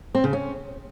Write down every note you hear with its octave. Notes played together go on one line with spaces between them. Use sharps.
C4
C#3
C#4